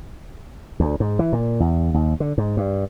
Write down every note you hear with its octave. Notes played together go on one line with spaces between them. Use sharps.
D2
G#2
E3
A#2
E2
D#2
D3
G#2
G2